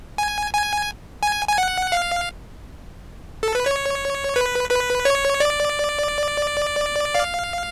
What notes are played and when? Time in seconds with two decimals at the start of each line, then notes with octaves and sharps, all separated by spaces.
0.18 G#5
0.53 G#5
1.23 G#5
1.48 G#5
1.58 F#5
1.92 F5
3.43 A4
3.55 B4
3.66 C#5
4.36 B4
4.71 B4
5.05 C#5
5.40 D5
7.14 F5